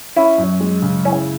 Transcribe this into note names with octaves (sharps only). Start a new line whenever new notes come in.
C#4 E4
F#2
G#3
C#3
C#4 E4